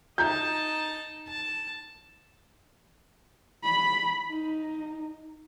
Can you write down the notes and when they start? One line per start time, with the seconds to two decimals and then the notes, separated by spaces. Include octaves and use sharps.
0.18 D#4 A5 A#5 G6
1.28 A5
3.63 B5
4.30 D#4